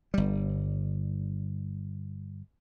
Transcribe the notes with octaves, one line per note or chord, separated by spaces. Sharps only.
G1 G3